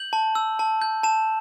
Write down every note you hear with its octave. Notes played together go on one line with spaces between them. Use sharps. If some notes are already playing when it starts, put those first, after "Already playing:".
Already playing: G6 F#7
A5
E6
A5
G6
A5 E7